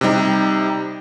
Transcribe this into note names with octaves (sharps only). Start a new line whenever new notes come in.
C3 G3 D#4 G4